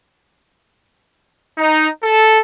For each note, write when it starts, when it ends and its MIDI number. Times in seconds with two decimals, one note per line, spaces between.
1.57 1.87 63
2.01 2.39 69